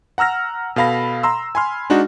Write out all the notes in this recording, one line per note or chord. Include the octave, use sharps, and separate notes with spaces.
F#5 A#5 E6 F6 A#6
B2 A4 F5 B5 A#6
A#5 C6 E6
G#5 B5 C6 F6
G#3 D4 D#4 F#4